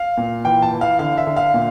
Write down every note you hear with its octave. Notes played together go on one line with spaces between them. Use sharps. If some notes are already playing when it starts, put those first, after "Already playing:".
Already playing: F5
A#2
E3 G5
A5
E3
F5
D3 F5
E5
D3
F5
A#2